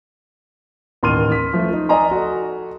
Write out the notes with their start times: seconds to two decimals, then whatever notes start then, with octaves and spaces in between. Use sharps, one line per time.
1.03 A1 D#2 C6 F6 D#7
1.32 B6
1.53 F3 A3
1.73 D#4
1.89 D5 D#5 G#5 A#5 C6
2.11 F#4 A4